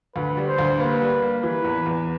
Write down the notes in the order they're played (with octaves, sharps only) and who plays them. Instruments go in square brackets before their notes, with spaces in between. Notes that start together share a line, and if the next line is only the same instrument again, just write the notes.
[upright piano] D2 [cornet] B4
[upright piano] G3
[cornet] C5
[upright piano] D2
[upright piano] A#3 [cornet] B4
[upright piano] G3
A#3
[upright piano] E3 [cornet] B4
[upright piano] E2
E2